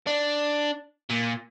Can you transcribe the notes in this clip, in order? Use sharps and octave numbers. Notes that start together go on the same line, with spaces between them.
D4
A#2